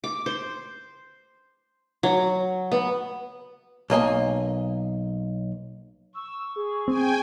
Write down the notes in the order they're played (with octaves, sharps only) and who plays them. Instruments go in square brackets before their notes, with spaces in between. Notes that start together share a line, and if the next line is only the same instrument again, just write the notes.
[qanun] D6
C5
F#3
B3
[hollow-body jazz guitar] B1 A#3 D#5 G#5
[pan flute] C#6 [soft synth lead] E6
[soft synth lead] G#4
[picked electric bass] C4 [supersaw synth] G5 G#5